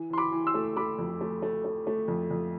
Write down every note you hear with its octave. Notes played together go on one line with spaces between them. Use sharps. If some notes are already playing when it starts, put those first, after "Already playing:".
Already playing: E3
E3 C6
B5 D6
E3
C6 E6
A3
A3 B5 D6
F2
A3
A3
A3
A3
F2
F2